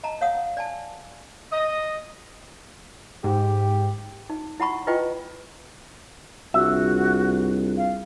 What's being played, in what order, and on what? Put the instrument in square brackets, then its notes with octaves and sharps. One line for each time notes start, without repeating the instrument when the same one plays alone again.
[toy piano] D#5 A5 A#5
C#5 F5 F#5 D#6
D5 G#5 A5
[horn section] D#5
[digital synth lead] G#2 [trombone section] G4
[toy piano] D#4
E4 F#5 B5 C#6
E4 F4 B4 D#5 G5 C#6
[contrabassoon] C2 [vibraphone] D4 F4 G#4 [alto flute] F#4 [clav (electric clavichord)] E5
[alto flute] F5